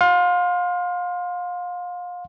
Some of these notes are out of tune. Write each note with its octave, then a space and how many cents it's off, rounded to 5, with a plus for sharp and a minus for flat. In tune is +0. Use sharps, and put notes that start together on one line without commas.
F5 +30 C6 +0